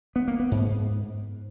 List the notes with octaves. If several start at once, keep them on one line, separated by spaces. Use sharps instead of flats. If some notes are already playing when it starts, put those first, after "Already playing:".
B3
A#3
B3
G#2